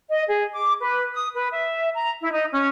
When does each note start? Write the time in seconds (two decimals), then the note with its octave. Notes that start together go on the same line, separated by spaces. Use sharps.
0.09 D#5
0.27 G#4
0.53 D6
0.81 B4
1.14 D#6
1.35 B4
1.51 E5
1.93 A#5
2.21 E4
2.32 D#4
2.52 C#4